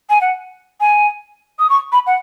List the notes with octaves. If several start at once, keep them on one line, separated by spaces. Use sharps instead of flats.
G#5
F#5
G#5
D#6
C#6
B5
F#5